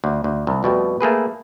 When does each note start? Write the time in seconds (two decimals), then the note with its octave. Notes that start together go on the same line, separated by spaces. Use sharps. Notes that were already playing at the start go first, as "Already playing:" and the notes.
0.04 D2
0.24 D2
0.47 C2
0.63 F2 B2 G3 A3
1.01 A3 A#3 G#4 B4